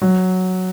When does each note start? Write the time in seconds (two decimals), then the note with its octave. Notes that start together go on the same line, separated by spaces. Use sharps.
0.02 F#3